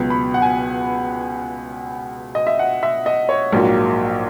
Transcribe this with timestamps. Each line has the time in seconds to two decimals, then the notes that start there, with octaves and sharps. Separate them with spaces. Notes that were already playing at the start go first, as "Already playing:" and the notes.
Already playing: C#2 B2 F#3 B3
0.10 B5
0.34 F#5
0.42 G#5
2.35 D#5
2.47 E5
2.59 F#5
2.83 E5
3.06 D#5
3.29 C#5
3.52 A#1 G#2 F#3 A#3